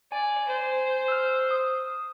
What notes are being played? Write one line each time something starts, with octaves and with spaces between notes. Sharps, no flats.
D5 G#5
C5
E6 F6
D#6